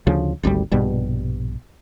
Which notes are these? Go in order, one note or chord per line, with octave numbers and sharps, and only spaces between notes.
D2 C#3 F3
G#1 D2 C3 G3
A#1 G2 B2 G3